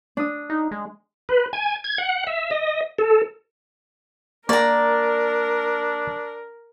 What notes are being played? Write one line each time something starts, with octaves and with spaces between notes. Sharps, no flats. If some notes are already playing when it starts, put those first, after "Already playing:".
D4 D#6
D#4
G#3
B4
G#5
G#6
F#5
E5
D#5
A4
A#3 D4 A#4 D5 A#5